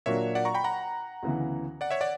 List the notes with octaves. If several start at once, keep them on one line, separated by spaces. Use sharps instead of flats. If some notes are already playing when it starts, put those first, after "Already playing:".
A#2 F#3 A#3 D4 F#4 C#5 E5
D5 F#5
A#5 C#6
G5 B5
F#5 A#5
D2 C#3 E3 B3
D5 F#5
C#5 E5
D5 F#5